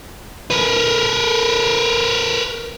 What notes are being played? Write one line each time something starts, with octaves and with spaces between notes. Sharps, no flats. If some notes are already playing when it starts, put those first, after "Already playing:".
A#4 B4